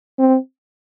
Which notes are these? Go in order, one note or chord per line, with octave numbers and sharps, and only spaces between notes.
C4